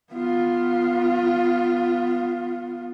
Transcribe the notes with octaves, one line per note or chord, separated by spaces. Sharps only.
B3 F4